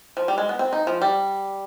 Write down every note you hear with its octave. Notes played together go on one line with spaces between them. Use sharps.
F3
G3
G#3
B3
C4
D#4
F3
G3